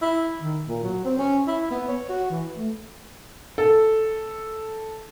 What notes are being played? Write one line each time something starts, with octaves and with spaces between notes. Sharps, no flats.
E4
D#3
A#2
F#3
C4
C#4
E4
B3
C#5
F#4
E3
A3
A4